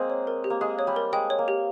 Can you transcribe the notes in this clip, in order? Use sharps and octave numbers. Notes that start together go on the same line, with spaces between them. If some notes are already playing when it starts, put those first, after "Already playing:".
Already playing: G#3 A#3 C4 C5
C#5
A#4
G4
A#3
G#3 F5
C#5
G3
A#4
G#3 G5
C#5
A#3
G4